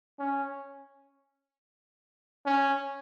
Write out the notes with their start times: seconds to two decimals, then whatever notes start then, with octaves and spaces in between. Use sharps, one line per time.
0.20 C#4
2.46 C#4